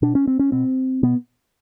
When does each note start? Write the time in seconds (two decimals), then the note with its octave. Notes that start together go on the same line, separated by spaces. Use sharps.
0.02 B2 D4
0.15 C#4
0.27 C4
0.39 C#4
0.52 B2 C4
1.03 B2 B3